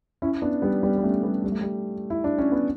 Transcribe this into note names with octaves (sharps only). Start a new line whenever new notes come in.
C#4 E4
B3 D4
G3 B3
G3 B3
B3
A3 C#4
G3 B3
G3
A3
G3
E4
D4
C#4
B3